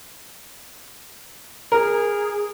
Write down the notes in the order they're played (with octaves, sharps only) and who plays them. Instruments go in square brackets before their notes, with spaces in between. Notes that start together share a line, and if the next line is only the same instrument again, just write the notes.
[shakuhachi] G#4 [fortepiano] A#4